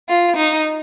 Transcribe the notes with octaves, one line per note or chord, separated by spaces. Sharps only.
F4
D#4